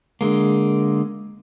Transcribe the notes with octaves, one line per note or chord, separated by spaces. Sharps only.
D3 G#3 A#3